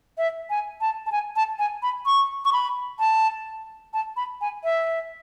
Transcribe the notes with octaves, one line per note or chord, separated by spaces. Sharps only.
E5
G#5
A5
A5
G#5
A5
G#5
B5
C#6
C#6
B5
A5
A5
B5
G#5
E5